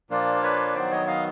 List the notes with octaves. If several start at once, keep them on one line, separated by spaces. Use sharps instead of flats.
A#2 F3 A#3 D4 F4
B4 C#5
D#3 F#3 B3 C5 D5
C#5 D#5
D#5 F5